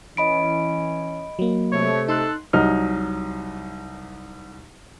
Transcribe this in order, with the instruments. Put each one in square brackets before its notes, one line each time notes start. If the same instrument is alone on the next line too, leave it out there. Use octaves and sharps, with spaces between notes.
[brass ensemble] E3 C#4 [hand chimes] D#5 B5 D7
[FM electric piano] F#3 A#3
[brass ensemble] C3 A3 [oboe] C#5
[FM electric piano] D#4 C6 F#6 [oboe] A4
[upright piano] C2 F#3 D#4 F6